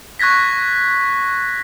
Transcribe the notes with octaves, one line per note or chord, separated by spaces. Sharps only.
C#6 F#6 G#6 A#6 B6